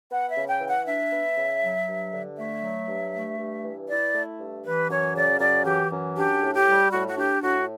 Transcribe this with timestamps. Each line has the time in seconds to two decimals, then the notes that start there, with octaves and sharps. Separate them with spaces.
0.10 B3 F#5
0.30 E5
0.36 C#3
0.48 G5
0.61 E3
0.68 F#5
0.86 D4 E5
1.11 B3
1.36 C#3
1.62 F#3
1.87 G2
2.12 D3
2.37 A3 E5
2.62 F#3
2.88 G2
3.13 A3
3.39 G2
3.63 E3
3.88 E4 D5
4.14 A3
4.40 G2
4.64 E3 B4
4.89 F#2 C#5
5.14 C#3 D5
5.39 F#2 D5
5.65 E3 G4
5.90 F#2
6.15 D4 G4
6.41 A2
6.54 G4
6.66 G3
6.91 A2 F#4
7.07 F#4
7.17 D4 G4
7.41 A2 F#4